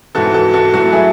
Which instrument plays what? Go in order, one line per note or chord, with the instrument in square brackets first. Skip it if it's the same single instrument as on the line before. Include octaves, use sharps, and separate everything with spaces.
[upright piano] G#2 E3 F#4 A4
F#4 A4
F#4 A4
A2 F#3 F#4 A4
E4 G#4